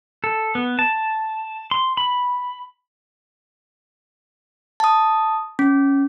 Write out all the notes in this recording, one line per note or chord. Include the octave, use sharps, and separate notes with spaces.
A4
B3
A5
C6
B5
A5 D#6
C#4